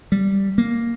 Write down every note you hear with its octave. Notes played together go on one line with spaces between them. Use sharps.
G3
A#3